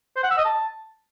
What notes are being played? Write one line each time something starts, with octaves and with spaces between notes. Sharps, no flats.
C5
F#5
E6
D#5
A5